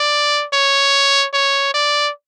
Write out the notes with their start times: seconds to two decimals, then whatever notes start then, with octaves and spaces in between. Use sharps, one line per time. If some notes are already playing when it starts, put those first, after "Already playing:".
Already playing: D5
0.53 C#5
1.34 C#5
1.74 D5